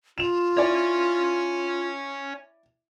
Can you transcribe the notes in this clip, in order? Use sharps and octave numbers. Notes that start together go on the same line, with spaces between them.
F4 E7 F7
E4 C#5 D5 G#5